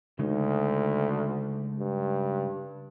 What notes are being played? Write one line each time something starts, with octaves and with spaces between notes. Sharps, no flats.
D2 C#3 G#3 D#4
G2